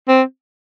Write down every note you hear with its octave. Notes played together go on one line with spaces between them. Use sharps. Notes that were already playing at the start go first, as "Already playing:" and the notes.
C4